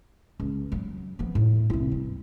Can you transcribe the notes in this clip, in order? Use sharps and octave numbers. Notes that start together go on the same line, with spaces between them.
C#2
F#3
F3 B3
A2
C2 E4
G2